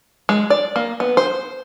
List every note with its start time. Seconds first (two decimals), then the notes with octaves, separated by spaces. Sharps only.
0.29 G#3
0.50 D5
0.76 A#3
1.00 B3
1.17 C5